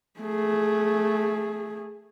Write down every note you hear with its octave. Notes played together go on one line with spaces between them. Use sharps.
A3 G#4